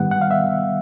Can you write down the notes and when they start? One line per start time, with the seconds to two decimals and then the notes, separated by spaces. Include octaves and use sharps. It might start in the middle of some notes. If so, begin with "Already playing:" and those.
Already playing: G#2 D#3 G3 B3 F#5
0.11 F#5
0.21 F5
0.31 E5